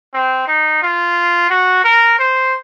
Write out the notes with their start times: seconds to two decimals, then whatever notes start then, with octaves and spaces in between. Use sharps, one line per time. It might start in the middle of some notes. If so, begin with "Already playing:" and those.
0.14 C4
0.48 D#4
0.82 F4
1.50 F#4
1.84 A#4
2.19 C5